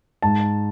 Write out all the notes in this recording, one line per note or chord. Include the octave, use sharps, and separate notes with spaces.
G#2 A5